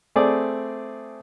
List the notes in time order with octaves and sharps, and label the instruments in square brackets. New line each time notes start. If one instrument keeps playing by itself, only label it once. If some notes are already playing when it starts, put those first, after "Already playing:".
[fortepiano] A3 C4 G#4 D5